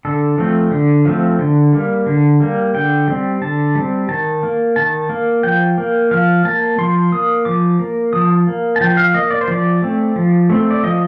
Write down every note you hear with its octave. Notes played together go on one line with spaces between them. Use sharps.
D3 A4
F3 A3 C4
D3
F3 A3 C4
D3
G3 A#3
D3
G3 A#3
D3 G5
G3 C4
D3 A5
G3 C4
D#3 A5
A#3
D#3 A5
A#3
F3 G5
A#3
F3 F5
A#3 A5
F3 C6
A#3 D#6
F3 D6
A#3
F3 D#6
A#3
A5
F3 G5
F5
A#3 D#5
D5
C5
F3 D5
A3 C4
F3
A3 C4
D5
F3 D#5